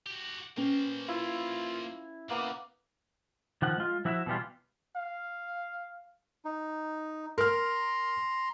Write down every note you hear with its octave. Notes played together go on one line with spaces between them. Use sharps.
F#4 G4
A#3 C#4 B4 C5 G5
E4 F4
C#3 A#3 B3 D6
D#3 F3 F#5
G#3 F4
F3 E4 F#4 D5 E5
B2 E3 G3 F4
F5
D#4
A#4 A#5 C6 F6